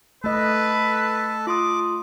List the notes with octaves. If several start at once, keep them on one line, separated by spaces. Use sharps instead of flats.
A3 A4 B4 D#5 A5
F4 C6 D6 D#6